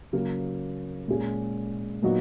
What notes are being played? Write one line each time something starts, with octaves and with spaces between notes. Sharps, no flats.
C#3 F#3 A#3
A#2 G#3 C#4 G#4
A#2 F#3 B3 D#4 F#4